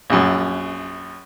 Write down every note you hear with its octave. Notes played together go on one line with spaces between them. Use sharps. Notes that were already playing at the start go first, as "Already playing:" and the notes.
A#1 F#2